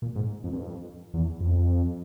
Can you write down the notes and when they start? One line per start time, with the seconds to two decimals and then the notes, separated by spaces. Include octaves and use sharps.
0.02 A#2
0.16 G#2
0.44 F2
0.53 G2
0.58 F2
1.14 E2
1.40 F2